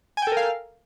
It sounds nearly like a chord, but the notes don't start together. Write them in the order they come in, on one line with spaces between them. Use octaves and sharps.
G#5 G5 A4 A#4 F5